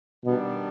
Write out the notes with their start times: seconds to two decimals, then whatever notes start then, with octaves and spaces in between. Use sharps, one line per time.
0.25 B2 D#3 G3 B3 D4